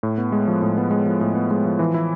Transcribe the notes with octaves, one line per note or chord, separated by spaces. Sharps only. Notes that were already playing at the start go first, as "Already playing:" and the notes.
A2
B3
G#3
F3
A2
B3
G#3
F3
A2
B3
G#3
F3
E3
E4